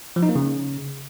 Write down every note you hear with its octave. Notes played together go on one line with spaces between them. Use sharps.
F3
D#4
A#3
C#3